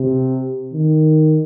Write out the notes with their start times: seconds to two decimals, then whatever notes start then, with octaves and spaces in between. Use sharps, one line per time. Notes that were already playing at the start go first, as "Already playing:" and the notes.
Already playing: C3
0.73 D#3